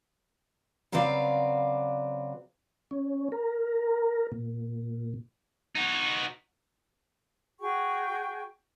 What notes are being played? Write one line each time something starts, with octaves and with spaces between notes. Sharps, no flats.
C#3 F#3 C4 B4 D5 F5
C#4
A#4
A#2
D#4 F#4
F#4 G#4 G5 C#6